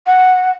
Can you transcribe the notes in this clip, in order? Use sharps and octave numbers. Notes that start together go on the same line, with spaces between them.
F#5